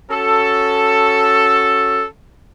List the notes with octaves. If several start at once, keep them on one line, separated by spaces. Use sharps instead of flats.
C#4 F#4 A4